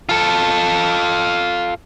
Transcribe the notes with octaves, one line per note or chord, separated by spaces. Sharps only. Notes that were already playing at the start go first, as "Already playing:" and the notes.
F4 A4